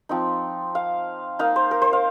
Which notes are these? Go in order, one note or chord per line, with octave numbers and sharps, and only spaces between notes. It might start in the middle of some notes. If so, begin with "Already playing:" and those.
F3 C4 D#4
F5
A#3 D#4 F5
C5
A#4
C5
F5